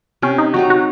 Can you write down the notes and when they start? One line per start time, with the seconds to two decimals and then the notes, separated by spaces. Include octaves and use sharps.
0.22 C3 C#4
0.38 D#4
0.54 F#3 C4 D#4 F#4
0.70 F#4